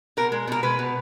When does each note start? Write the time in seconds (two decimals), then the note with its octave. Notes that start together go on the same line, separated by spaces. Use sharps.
0.17 B2 A#4
0.32 G#3
0.47 B2 A#4
0.63 G#3 B4
0.79 B2